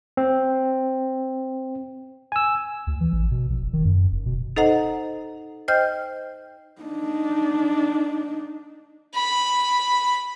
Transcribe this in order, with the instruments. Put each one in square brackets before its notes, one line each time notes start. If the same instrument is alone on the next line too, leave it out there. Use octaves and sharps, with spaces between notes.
[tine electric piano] C4
G#5 E6
[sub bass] D2
E3
A1
B2
A#1
F1
D#3
F#2
F1
B2
[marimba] D#4 A4 C5 D#5 F#5 A#5
C5 D#5 G5 F6 G6
[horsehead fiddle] D4 D#4
[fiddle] B5